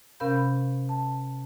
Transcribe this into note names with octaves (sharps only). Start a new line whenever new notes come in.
C3 C#4 A#4 F5 B5 G6
A5